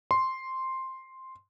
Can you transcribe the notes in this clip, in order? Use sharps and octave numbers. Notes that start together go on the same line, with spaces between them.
C6